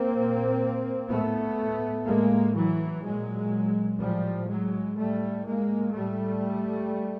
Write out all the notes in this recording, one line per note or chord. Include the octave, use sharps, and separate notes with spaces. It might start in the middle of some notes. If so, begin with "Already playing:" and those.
Already playing: A#3 C4
A#2
A2 A3 B3
A2 G#3 A#3
E3 F#3
A#2 F#3 G#3
A2 F3 G3
F#3 G#3
A2 G3 A3
G#3 A#3
A2 G3 A3